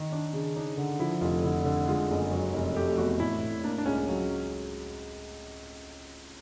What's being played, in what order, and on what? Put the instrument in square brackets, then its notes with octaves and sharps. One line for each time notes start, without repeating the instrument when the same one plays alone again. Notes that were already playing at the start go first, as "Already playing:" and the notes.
Already playing: [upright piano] D#3
D4
C#3
[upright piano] D4 [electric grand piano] D#4
[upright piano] D3
[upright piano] F3 [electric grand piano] E4
[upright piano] F1 [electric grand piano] F4
[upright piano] D3 [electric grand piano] E4
[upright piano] D3
[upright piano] G#3 [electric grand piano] F4
[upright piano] F#1
F#3
F1
[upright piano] A3 [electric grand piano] G4
[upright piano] E2 [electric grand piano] F#4
[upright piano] A2 [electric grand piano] E4
[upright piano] A2
[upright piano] A#3 [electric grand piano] D4
[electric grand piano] D4
[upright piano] C#2 [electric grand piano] C#4
[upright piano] F#3